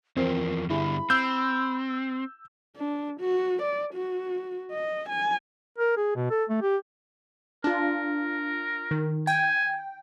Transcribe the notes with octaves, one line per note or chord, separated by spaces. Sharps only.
E2 F3 C4 A#4
G2 D3 G3 E4 G#4 B5
C4 E6 G6
D4
F#4
D5
F#4
D#5
G#5
A#4
G#4
B2
A4
A3
G4
D4 F4 A#4
D#3
G5 G#5